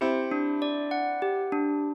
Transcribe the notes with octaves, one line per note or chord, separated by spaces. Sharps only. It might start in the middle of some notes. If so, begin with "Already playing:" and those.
C4 E4 G4
D4
D5
F#5
G4
D4